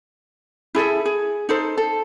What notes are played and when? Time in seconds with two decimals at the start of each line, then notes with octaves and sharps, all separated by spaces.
0.75 E4 G#4 A4 E5
1.05 G#4
1.49 D#4 A4 C5
1.78 A4